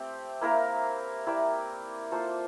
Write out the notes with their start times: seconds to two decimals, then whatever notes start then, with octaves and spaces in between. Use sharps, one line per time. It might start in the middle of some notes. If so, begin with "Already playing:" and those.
Already playing: A3 C4 G4
0.41 A#3 E4 A#4 F5
1.26 E4 G4 A#4 D5
2.11 A#3 F4 A4 C5